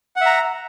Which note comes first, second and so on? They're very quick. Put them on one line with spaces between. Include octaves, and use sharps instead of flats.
F#5 E5 A#5